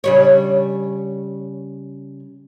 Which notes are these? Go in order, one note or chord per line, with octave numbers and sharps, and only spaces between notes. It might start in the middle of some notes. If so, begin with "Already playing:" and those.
C#3 G3 C#5